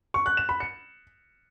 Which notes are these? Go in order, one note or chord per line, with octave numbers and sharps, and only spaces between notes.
C#6
F#6
E7
B5
C#7